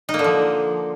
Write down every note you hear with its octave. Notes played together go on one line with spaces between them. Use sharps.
D#4
A#3
D3
F3